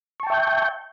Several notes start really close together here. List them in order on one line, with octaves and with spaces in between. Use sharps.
C#6 A5 G5 E5 G6